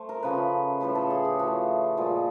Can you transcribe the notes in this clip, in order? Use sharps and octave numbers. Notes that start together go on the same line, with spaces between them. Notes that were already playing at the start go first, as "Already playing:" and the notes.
Already playing: A3 C5
A#4
C#3 F3 A3 B4
A2 F3 A3 B4
A4
G#4
G4
A2 F3 A3 F#4
A#2 F3 G#3